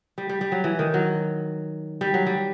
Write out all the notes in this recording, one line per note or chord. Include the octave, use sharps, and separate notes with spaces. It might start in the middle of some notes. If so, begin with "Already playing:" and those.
G3
G3
G3
F#3
E3
D#3
F#3
G3
F#3
G3